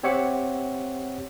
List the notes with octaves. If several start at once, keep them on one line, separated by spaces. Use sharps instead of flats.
C4 G4 C#5 E5 F#5 D6